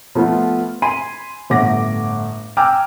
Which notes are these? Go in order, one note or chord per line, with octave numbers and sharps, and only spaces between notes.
F3 A3 B3 F4
G#5 B5 C6 D#7
G1 A2 F#5 D6 A#6
G5 G#5 A#5 D6 E6 F6